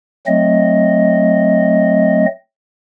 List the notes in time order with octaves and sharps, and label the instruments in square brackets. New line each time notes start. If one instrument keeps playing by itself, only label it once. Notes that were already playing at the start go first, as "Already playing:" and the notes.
[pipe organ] F#3 A3 C4 D#5